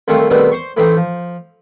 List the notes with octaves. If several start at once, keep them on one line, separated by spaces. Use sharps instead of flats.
C2 D#3 A3 C4 F4 C#6
B2 D#3 G3 A3 B3 C4
C5 C6 C#6
A2 E3 A3 C4 D#4
F3